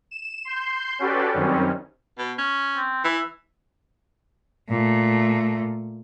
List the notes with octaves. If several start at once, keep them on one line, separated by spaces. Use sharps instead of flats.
E7
C6 G6
C#4 F#4 G4 A4 B4 D5
F#2 D#3 G3 C4 C#4
B2
C#4
C4
E3 E5
A#2 A3